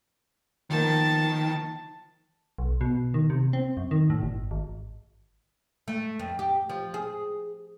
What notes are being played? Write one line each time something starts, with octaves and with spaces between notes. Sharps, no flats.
D#3 F3 A#3 B3 A5
B1
B2
D#3
C3
C4
F#2
D#3
A2
G1
G#1
A3
F2
G4
F3
G#4